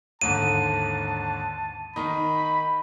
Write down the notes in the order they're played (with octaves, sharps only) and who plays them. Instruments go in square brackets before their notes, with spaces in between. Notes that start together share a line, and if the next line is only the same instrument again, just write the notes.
[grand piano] D#2 G#2 D3 [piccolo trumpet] A5 [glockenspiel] D#7
[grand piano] D#3 D#4 [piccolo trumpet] B5